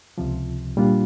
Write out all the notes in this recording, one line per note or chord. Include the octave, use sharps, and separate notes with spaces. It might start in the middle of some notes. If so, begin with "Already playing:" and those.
C#2 C3 F3
A#2 G3 A#3 D4 F4